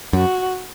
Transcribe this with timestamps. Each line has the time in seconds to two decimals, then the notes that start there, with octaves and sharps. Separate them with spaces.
0.13 F#2 F#4